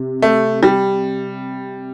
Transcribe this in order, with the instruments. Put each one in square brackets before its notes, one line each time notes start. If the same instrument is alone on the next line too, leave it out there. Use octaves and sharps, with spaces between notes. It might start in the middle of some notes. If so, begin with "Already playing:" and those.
Already playing: [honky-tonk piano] C3
[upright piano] A3
G3